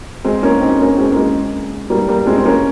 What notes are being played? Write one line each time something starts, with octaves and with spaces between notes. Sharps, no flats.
G#3 C4
A#3 C#4
C4 D#4
A#3 C#4
G#3 C4
A#3
G#3
G3 A#3
G3 A#3
G#3 C4
C4
A#3 C#4